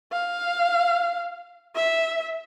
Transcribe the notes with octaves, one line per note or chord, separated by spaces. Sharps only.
F5
E5